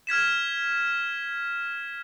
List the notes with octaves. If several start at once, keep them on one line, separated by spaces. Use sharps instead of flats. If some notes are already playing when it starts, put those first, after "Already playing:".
F6 G#6 B6 E7